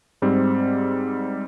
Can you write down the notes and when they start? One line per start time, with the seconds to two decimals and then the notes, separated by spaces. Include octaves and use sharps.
0.22 G#2 G3 C4